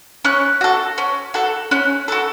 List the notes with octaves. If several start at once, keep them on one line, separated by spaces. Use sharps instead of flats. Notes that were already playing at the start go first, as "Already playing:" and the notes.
C#4 F#6
F#4 A4
C#4
F#4 A4
C#4 F#6
F#4 A4